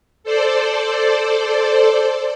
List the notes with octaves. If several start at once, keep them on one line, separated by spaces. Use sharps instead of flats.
A4 C5 D5